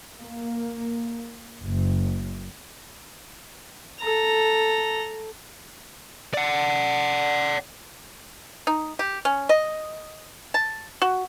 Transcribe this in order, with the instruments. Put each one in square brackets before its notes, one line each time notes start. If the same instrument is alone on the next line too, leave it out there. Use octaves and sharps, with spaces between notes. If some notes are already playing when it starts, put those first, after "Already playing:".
[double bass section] A#3
F#1
[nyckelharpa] A4 A#5
[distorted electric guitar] D5 F#5
[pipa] D#4
G4
C#4
D#5
A5
F#4